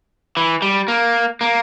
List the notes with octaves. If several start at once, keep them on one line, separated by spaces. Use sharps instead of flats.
E3
G3
A#3
A#3